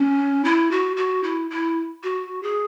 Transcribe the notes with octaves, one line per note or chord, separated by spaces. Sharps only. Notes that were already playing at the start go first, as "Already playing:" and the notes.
Already playing: C#4
E4
F#4
F#4
E4
E4
F#4
G#4